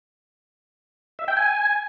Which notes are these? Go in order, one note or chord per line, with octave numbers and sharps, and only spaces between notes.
E5
G5
G#5